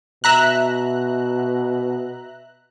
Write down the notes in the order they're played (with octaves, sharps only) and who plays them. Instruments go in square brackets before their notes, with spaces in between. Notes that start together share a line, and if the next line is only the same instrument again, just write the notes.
[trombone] B2 [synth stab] E5 A#5 F#6